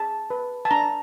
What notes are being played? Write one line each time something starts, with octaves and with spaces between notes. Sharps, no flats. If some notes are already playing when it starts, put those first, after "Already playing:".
Already playing: G#4 A5
B4
A5
D4 A#5